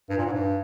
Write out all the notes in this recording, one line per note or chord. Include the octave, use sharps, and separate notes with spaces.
G2
A#2
G#2
G2